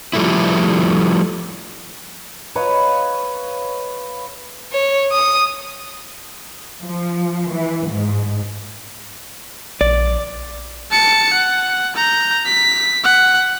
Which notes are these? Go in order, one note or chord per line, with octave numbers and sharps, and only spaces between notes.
F3 G3 A3 E4
B4 C#5 D#5 F5
C#5
D#6
F3
E3
G#2
A#1 D5
A5 C#7
F#5
A#5 G6
B6
F#5